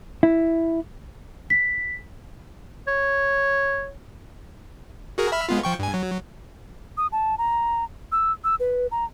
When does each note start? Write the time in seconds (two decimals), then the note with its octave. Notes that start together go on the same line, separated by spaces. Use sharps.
0.23 E4
1.50 B6
2.87 C#5
5.18 F#4 G#4 A#4
5.32 E5 B5 F6
5.49 G#3 B3 F4
5.63 F3 G5 C#6
5.79 G2 G#5
5.94 F#3
6.97 D#6
7.12 A5
7.38 A#5
8.12 E6
8.44 E6
8.60 B4
8.91 A#5